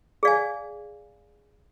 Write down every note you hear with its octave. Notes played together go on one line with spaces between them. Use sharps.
G#4 D5 F5 G#5